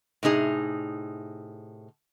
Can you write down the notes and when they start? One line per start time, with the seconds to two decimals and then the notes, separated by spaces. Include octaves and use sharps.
0.23 A2 C3 D#4 G#4